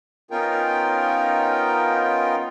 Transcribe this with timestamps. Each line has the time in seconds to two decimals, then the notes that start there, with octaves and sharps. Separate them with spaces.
0.31 B3 C#4 D#4 F4 A#4 G5